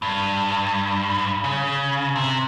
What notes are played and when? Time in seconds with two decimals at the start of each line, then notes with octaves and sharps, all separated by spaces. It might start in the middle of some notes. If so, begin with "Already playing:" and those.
0.02 G2
1.44 C#3
2.16 C3